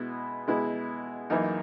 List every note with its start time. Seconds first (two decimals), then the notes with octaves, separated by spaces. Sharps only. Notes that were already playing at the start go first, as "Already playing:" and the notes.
Already playing: B2 G#3 B3 E4
0.48 B2 G#3 B3 E4
1.30 F#2 E3 A#3 D#4